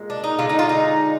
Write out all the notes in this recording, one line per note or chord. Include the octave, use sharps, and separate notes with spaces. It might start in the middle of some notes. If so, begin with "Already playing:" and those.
Already playing: A#2 G#3
D4
D#4
D3 G#3 F4
D#4
F4
D#4